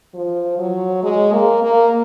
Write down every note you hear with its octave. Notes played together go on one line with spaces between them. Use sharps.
F3
F#3
G#3
A#3
A#3